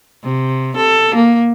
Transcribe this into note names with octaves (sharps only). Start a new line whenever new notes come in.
C3
A4
A#3